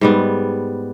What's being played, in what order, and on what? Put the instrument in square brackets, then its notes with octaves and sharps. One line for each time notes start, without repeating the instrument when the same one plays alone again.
[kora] G#2 G3 B3